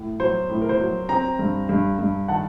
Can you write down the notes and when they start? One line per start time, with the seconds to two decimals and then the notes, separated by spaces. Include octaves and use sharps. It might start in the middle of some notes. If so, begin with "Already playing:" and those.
Already playing: A2
0.20 F#3 C5
0.49 A2
0.61 A#4
0.69 C5
0.80 F#3
1.09 C4 G5 A#5
1.39 G2
1.69 G2
1.99 G2
2.28 D#3 F#5 A5